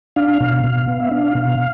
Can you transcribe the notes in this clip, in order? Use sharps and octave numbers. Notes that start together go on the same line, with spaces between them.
D4 F5
B2
B2
B3
E5
D4 F5
B2